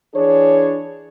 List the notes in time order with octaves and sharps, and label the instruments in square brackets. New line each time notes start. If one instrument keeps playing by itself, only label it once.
[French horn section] E3 D4 G#4 C#5